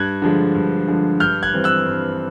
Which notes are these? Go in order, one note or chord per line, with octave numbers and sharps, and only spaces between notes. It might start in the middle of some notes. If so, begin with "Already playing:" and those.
Already playing: G2 F#6 G#6
D3 F3 G#3
G2
D3 F3 G#3
G2 F6 G6
F#6 G#6
E3 G3 C4
E6 F#6
G2